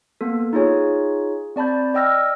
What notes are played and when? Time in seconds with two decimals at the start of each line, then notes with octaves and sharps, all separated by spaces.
0.21 A#3 B3 A4
0.53 D#4 F4 G#4 C#5 G#5
1.56 C4 D5 A5 B5 G6
1.94 D5 D#5 G5 E6 F6 A#6